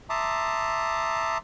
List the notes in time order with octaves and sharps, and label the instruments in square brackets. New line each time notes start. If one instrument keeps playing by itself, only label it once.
[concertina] E5 A5 A#5 C6 D6 D#6